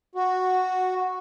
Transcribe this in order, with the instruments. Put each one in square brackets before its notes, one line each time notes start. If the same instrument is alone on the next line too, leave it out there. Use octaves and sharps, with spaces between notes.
[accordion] F#4